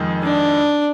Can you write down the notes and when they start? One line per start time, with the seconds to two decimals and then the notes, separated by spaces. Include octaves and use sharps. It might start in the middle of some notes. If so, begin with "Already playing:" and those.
Already playing: F2 D#3 G#3 D#4
0.23 D4